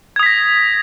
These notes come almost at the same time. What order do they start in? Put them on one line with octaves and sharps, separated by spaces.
G#6 D#6 B6 A#6